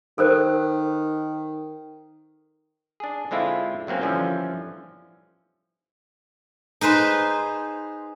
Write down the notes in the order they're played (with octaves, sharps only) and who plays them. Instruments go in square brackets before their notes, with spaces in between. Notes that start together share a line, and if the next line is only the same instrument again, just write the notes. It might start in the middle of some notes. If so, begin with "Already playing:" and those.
[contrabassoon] D#3 [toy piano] A4 A#4 C5
[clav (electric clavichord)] D4 G#4
D3 G#3 C4 E4 F4
C#3 F#3 A#3 C4 C#4
D3 E3 F3 G3 C#4
[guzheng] D#4 G#4 B4 C5